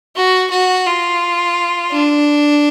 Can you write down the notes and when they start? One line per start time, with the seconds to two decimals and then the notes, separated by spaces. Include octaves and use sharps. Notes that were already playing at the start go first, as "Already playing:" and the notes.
0.16 F#4
0.50 F#4
0.86 F4
1.91 D4